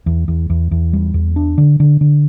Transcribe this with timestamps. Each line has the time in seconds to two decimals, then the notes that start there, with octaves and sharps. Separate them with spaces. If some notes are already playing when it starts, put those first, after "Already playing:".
0.06 E2
0.28 E2
0.50 E2
0.71 E2
0.93 G3
1.14 E2
1.36 D4
1.58 D3
1.80 D3
2.01 D3